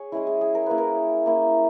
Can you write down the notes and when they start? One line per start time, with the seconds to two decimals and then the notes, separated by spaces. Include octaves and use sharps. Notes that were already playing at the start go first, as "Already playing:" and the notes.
Already playing: G#4 C#5
0.12 G#3 C#4 E4 D#5
0.27 G#4
0.41 G#4
0.55 A#4
0.66 A#3 C#4 E4 B4
0.78 A#4
1.26 A#3 C#4 E4